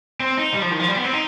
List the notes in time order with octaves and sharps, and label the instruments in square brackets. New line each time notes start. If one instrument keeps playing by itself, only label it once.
[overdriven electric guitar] C4
D#4
G3
F3
D#3
F3
G3
B3
C4
D#4